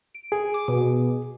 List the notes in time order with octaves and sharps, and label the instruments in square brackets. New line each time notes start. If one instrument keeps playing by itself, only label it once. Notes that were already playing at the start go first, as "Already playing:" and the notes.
[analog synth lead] D7
[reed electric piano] G#4
[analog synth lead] D6
B2